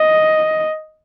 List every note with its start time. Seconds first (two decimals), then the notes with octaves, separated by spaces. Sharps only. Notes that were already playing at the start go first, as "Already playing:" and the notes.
Already playing: D#5